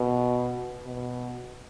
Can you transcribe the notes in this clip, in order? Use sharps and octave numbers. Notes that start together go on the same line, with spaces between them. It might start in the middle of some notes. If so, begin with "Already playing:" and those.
Already playing: B2
B2